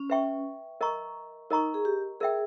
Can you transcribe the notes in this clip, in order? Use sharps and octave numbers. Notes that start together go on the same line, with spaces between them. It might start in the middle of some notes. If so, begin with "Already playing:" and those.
Already playing: C#4
B4 E5 G5 C#6
A#4 D#5 A#5 C#6
D#4 A#4 D#5 A#5 C#6
G#4
G4
G#4 A#4 E5 G5